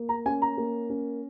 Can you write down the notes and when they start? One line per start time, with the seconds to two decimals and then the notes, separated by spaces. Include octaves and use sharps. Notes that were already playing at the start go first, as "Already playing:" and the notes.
Already playing: A#3
0.09 A#5
0.25 C#4 G#5
0.42 A#5
0.57 A#3
0.90 C#4